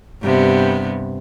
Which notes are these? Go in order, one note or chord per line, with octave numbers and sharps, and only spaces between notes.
G2 C3 B3